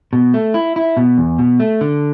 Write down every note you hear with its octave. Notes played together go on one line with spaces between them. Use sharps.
B2
A3
E4
E4
B2
E2
B2
A3
D3